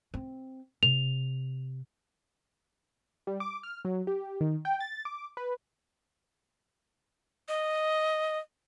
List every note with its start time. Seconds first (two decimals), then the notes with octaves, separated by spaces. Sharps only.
0.14 C4
0.83 C3 F7
3.27 G3
3.40 D6
3.63 F6
3.85 F#3
4.07 G4
4.41 D#3
4.65 G5
4.80 A6
5.05 D6
5.37 B4
7.48 D#5